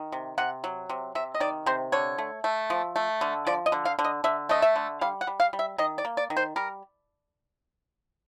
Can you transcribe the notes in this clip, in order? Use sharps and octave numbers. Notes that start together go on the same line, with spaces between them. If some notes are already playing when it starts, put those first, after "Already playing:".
Already playing: D#3
C3
C3 F#5
F#3
C3
C3 E5
D#5
D#3 D5
C3 C5
D3 C#5
A3
A3
F3
A3
D3
F3 D5
D#5
D3
F5
D3
D#5
D3 E5
A3 D#5
E5
D3
G3 F5
F#5
G3
F5
G3
E5
D#3 D#5
D5
A#3
D5
D#3
C5
G3 A#4